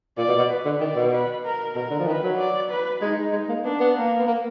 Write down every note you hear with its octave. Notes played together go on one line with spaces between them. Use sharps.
A#2 D5
B2
B2
B4
D3
D#3 D5
B2
B4
A#4
B2 A#4
D3
F3
D#3 B4
F#3
D5
B4
G#3 D#4
G#3
A#3
B3 D4
B3
A#3
B3
A#3